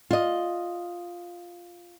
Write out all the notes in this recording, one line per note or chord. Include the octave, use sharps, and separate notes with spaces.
F4 D#5